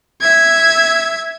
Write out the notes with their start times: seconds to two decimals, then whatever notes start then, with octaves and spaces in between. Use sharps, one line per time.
0.21 E5 G#6